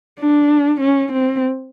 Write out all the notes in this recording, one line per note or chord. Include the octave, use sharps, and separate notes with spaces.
D4
C#4
C4